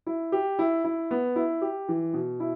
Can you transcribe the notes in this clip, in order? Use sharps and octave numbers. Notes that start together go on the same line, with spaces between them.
E4
G4
E4
E4
B3
E4
G4
E3
B2
E4